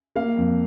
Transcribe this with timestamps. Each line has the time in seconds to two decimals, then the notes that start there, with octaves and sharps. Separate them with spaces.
0.16 A#3 F5
0.37 F2